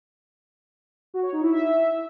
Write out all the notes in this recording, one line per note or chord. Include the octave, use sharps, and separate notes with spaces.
F#4
C#5
D#4
E4
E5